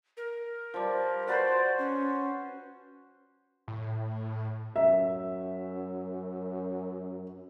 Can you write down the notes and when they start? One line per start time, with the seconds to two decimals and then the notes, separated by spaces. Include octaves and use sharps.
0.17 A#4
0.74 F3 G3
1.28 F#4 B4 C5 D5
1.78 C#4
3.68 A2
4.76 F#2 E5